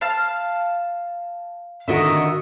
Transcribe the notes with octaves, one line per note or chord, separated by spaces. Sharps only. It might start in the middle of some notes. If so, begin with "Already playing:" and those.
F5 A5 F6
D3 D#3 F#4 A#4 D#5 E5